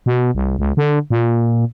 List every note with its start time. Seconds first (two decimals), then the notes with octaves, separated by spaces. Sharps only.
0.06 B2
0.35 C2
0.59 C#2
0.77 D3
1.10 A#2